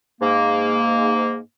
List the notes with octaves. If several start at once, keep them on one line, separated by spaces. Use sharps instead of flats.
G#2 A#3